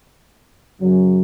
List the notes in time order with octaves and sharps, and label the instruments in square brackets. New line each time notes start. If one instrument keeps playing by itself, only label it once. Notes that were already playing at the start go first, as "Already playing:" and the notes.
[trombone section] F#2 C#3 F#3